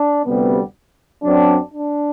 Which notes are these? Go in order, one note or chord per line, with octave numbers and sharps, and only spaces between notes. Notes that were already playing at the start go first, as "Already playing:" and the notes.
Already playing: D4
D2 C3 G3 B3
F#2 F#3 C4 D4
D4